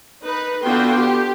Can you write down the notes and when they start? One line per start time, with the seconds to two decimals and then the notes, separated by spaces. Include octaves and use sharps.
0.23 D#4 B4
0.62 D3 B3 F4 F#4 G5 C6
0.98 G4